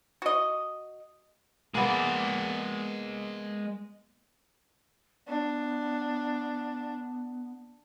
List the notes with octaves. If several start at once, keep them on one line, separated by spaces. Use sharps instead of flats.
F#4 D#5
G#3 A#3 B3 D5
B3 D4